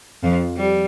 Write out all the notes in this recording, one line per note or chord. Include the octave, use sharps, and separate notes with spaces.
F2 F3
G3